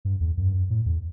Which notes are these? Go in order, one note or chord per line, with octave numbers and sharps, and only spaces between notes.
G2
E2
F#2
G2
F#2
A2
E2